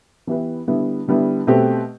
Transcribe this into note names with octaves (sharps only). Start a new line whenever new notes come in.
E3 B3 E4 G4 B4
D3 G3 B3 E4
D3 G3 B3 E4
B2 A3 C4 G4